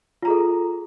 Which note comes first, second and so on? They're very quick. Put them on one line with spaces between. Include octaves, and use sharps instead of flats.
F4 A#5 G#4 A4